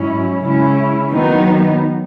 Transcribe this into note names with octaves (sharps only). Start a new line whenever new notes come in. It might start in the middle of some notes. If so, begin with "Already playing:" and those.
Already playing: G#2 F#3 C#4 E4
C#3 G#3 C#4 E4
D#3 F#3 B3 D#4